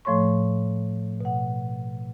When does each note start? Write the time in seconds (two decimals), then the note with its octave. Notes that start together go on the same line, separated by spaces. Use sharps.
0.05 A2 F3 A3 C#5 C6 C#6
1.21 B2 F#5